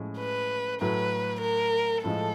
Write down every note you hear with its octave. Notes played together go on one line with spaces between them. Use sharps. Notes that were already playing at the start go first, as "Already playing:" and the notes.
Already playing: A2 F3 G#3 C#4
B4
A2 F#3 A3 B4
A#4
A2 F3 G#3 A4